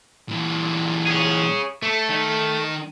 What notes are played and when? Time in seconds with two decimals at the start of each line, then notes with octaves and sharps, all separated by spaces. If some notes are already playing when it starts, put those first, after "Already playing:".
0.29 A#2 E3
1.07 C#4 G#4
1.83 A3 A4
2.09 D#3 D#4